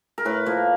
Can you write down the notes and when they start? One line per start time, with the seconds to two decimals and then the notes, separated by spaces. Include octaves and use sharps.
0.18 A#4
0.25 A2 B4
0.46 F3 A#3